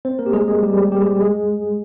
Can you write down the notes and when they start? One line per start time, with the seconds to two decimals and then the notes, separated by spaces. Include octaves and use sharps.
0.05 C4 C5
0.19 A#3 A#4
0.26 G4
0.33 G#3 G#4
0.48 G#3 G#4
0.62 G3 G4
0.77 G3 G4
0.92 G3 G4
1.02 G#4
1.06 G3 G4
1.21 G#3 G#4